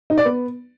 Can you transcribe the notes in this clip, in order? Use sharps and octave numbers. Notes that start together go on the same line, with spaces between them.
D#4
D5
B3